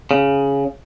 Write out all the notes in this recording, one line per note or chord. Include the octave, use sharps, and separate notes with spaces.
C#3